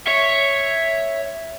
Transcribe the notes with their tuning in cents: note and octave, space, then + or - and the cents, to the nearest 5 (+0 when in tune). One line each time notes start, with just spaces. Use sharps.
C#5 +0 E5 +0